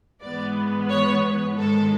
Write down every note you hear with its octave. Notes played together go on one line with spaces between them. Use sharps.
G#2 E3 G#3 B3 D5
C#5
G#2 D#3 G#3 A4